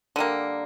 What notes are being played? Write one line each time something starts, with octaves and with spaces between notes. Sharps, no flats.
D3 G3 A#3